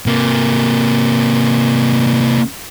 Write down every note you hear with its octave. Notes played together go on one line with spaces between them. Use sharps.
C3 A#3